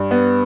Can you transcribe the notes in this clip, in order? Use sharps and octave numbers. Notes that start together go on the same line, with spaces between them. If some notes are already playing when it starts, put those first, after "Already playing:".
Already playing: G2
B3